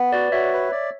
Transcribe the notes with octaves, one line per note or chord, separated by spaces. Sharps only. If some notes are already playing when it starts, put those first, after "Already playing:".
Already playing: B3
F#4 B4 D5
F#4 C#5 E5
B4
D5